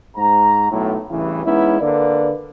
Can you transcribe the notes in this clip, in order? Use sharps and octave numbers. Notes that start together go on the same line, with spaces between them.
G#2 A#5
B1 A2
A1 G2 C#3 E3
G#3 B3 C#4 D#4 E4
D3 A#3 B4 D5